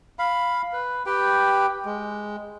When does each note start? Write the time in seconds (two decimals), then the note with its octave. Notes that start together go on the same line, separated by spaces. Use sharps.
0.19 F5 B5
0.73 B4
1.06 G4 B4 G5
1.85 G#3